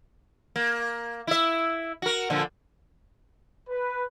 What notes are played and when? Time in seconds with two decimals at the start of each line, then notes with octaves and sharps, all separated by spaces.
0.56 A#3
1.27 E4 E5
2.02 F#4 A#4
2.30 A#2 D3 F3
3.70 B4